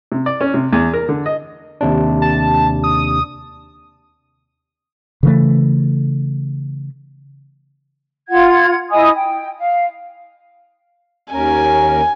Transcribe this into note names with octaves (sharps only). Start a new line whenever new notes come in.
C3
D5
C#4
C3
E2
A#4
D3
D#5
D#2 C3 D4
A5
D#6
C#3 E3 A3
F4 F#5 G#6
E4 D#5 G#5 D#6
G5
F5
D#2 C#4 A#4 G#5